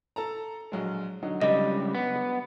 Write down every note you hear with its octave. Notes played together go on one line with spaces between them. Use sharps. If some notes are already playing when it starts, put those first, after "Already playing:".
A4 A5 A#5
A#1 F#3 G#3
D3 F#3 D#4
C#2 G3 D#5
B3